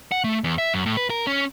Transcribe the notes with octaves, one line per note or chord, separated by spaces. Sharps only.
F#5
A3
E2
E5
F#2
A2
B4
A#4
C#4